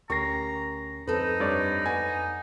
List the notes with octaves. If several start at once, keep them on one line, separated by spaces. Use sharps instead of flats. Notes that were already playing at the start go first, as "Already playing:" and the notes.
D2 C#4 G4 A#4 A#5 C#6 A#6 C7
F2 C4 D#4 A4 B4
G2 C#5 D5
B3 G#5